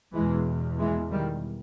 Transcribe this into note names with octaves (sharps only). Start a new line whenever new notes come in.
E2 B2 E3 G#3
E3 G#3
D#3 G3